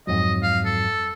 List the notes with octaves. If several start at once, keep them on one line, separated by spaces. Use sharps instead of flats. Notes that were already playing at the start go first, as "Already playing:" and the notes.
F2 G#2 F#3 D#5
F5
A4